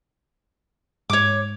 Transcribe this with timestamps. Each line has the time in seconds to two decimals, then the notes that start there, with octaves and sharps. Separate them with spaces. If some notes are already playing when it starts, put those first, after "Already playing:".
1.10 G#2 C#5 D6